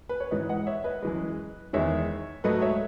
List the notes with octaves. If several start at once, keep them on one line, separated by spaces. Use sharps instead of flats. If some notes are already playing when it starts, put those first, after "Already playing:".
B4
C#5
G#2 E3 G#3 B4 D#5
D#5 F#5
C#5 E5
B4 D#5
F#2 E3 G#3
E2 D#3 G#3 C#5 E5
G#2 F#3 A3 B4 D#5
C#5 E5